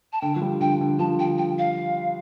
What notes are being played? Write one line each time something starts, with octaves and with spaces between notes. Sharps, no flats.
A5
D3 G5
F3
G3
D3 G5
D3
F3 A5
G5
G5
F5